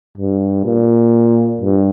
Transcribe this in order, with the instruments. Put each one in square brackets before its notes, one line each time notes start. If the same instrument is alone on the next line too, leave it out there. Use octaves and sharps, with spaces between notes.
[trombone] G2
A#2
G2